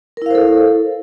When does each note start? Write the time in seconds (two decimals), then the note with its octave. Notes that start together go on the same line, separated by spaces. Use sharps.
0.17 A#4
0.22 E4
0.26 F5
0.31 C5
0.35 A4